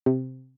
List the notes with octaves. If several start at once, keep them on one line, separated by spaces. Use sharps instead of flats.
C3